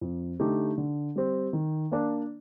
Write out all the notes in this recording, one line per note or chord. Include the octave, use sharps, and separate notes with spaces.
F2
D3 A3 D#4 G4
D3
G3 C4
D#3
A#3 D4